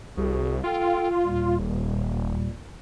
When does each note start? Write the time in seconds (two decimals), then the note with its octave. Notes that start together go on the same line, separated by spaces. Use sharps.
0.17 C2 F#4 G#4
0.64 F4 A4 G5
1.24 D#2 A#2 G3
1.59 D#1